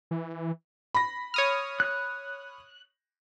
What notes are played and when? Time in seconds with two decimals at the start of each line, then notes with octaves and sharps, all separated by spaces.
0.11 E3
0.95 B5 A#6
1.34 C#5 D#6 F6
1.80 F#6